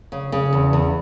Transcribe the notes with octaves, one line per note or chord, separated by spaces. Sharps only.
C#3
C#3
E2
E2